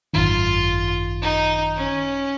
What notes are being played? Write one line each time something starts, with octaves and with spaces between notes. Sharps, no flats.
G#1 F#2 D#3 F4
D#4
C#4